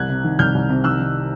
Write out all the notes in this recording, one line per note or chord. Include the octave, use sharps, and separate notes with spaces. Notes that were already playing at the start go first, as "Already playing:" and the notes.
Already playing: C2 F#6 G#6
C3
D#3
C2 F6 G6
C2
C3
D#3 E6 F#6
D#3